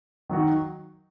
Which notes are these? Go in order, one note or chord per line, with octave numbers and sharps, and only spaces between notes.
D#3 F#3 D#4 F#4